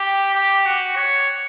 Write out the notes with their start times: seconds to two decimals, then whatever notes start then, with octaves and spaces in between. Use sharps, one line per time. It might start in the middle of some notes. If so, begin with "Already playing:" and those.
Already playing: G4
0.34 G4
0.66 F#4
0.96 C#5